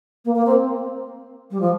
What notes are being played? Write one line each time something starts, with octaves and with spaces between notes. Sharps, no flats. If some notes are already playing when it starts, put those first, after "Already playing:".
A#3
A#3
C4
G3
F3